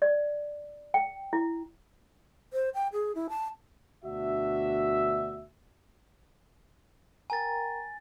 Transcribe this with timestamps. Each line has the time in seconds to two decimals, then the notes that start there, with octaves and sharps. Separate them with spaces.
0.02 D5
0.94 G5
1.33 E4
2.53 C5
2.74 G5
2.92 G#4
3.15 E4
3.29 A5
4.05 D2 B2 D4 F#4 E5
7.30 A#4 G5 G#5 A#5 A6